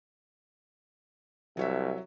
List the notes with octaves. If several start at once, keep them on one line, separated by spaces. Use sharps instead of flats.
C2 F#3 C#5 E5